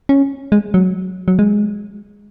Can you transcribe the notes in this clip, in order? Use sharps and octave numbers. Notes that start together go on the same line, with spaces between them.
C#4
G#3
F#3
F#3
G#3